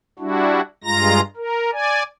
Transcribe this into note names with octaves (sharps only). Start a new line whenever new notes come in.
G3 D4 E4 F#4
G2 G#3 F4 A#5 A#6
A#4
D5 G#5